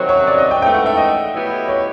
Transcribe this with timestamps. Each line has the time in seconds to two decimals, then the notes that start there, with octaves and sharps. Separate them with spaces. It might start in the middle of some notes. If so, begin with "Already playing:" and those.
Already playing: C3 D#3 F#3 C5
0.09 C#5
0.27 D5
0.38 D#5
0.51 G5
0.62 G#2 E3 A3 G5
0.74 F#5
0.86 E5
0.97 D#5
1.33 A2 F#3 B3 E4 G4
1.68 C#5